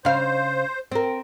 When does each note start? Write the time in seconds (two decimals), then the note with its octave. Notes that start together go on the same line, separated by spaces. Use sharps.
0.05 C#3 C5 F5
0.92 C4 A#4